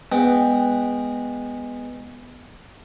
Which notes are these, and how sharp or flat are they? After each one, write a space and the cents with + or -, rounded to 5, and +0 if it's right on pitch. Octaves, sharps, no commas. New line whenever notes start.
G#3 -15 B3 +0 G5 +0